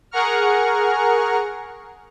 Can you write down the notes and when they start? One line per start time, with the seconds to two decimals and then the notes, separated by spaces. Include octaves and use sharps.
0.11 G#4 A#4 F#5 A#5 C#6 F6